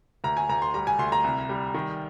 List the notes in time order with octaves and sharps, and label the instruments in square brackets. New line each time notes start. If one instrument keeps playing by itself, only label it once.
[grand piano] D2 A#5
G#5
D2 A#5
C6
G3 A#5
G#5
D2 C6
A#5
C2
G3
D#3